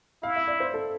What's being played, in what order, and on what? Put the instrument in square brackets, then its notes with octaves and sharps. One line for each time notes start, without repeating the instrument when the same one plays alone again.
[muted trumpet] E4 [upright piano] F5
[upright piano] E5
D5
C5
A4